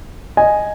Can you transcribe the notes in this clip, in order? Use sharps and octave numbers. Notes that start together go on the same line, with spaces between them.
D#5 G#5